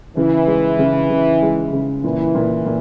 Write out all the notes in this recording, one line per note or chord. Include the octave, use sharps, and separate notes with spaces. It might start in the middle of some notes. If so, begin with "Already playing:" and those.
C#3 E3
G#3
C#3
C#3
G#3
C#3
A#2 E3
A#2
A#2